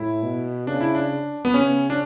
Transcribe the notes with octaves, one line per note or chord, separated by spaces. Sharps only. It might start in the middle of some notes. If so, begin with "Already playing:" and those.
Already playing: A2 E4
B2
C#3 D4
E4
D4
B3
C#3 C#4
D4